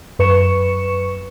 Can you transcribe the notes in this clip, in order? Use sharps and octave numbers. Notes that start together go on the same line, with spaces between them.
F#2 B4 C#6 C#7 E7